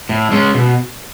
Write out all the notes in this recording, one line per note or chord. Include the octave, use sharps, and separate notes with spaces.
A2
G#3 C#4
B2